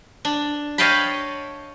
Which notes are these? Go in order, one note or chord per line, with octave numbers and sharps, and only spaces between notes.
D4
C#5 D#5 F5 G5 A5 B5